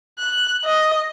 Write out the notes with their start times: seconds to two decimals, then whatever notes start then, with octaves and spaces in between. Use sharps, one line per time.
0.19 F#6
0.64 D#5